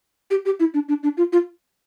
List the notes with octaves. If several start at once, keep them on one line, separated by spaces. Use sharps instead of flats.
G4
G4
E4
D4
D4
D4
F4
F4